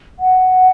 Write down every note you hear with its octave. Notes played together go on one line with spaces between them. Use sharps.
F#5